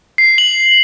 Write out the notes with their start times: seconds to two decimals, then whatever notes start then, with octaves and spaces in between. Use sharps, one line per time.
0.18 C7
0.38 F#7